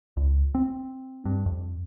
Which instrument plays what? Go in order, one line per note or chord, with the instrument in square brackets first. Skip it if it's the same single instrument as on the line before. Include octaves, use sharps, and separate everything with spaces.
[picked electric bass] C#2
C4
G2
F2